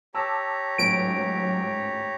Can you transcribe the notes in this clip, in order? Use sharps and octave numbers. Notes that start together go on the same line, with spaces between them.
G4 C#5 A5 A#5 D6 E6
G#1 C#2 A2 F#3 D7